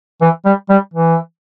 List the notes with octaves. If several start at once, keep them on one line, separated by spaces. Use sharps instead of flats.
E3
G3
G3
E3